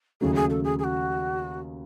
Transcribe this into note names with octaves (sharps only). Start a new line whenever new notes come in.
D#2 C#3 F#3 A3 G#4
G#4
A4
G#4
G#4
F#4